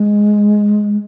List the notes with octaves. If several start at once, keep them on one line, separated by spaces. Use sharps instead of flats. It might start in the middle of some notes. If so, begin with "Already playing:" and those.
Already playing: G#3